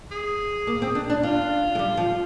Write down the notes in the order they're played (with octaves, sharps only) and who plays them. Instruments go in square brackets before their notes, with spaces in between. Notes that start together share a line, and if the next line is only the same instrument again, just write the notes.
[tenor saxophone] G#4
[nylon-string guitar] A#3
C4
D4
D4
[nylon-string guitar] D4 [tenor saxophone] F4
[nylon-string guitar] G#3
G3
F3